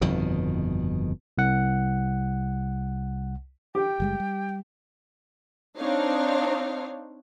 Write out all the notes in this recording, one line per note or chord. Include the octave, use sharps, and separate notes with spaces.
G1 F2 B2 D#3
C2 F#5
G4 G5
F#1 G3 G#3
G3
C4 D4 D#4 C#5 F5